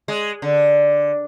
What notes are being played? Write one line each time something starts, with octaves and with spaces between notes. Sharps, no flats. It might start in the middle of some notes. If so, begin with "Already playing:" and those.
G#3
D3